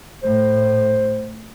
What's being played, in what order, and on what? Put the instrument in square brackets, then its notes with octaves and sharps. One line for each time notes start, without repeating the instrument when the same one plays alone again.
[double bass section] A2 [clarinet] C5